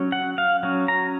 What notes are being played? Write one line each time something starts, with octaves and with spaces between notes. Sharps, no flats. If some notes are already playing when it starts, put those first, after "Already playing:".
Already playing: F#3 C#4
F#5
F5
F#3 C#4
A#5